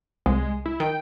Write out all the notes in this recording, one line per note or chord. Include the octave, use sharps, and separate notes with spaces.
C2 G#3
E4
D#3 G5